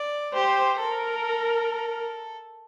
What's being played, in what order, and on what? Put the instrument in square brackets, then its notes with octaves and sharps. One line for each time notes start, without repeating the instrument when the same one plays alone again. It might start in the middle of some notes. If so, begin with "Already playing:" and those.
Already playing: [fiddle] D5
[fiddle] G4 [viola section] C5
[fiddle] A4 [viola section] A#4